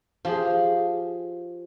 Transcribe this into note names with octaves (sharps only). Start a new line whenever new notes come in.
F3 G4 G#4